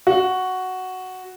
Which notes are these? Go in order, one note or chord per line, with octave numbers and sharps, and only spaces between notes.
F#4